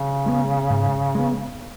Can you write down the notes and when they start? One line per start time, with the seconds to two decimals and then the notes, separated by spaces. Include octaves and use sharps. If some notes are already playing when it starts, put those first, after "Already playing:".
Already playing: C#3
0.26 G#3 B3
0.70 G#2
1.15 G#3 B3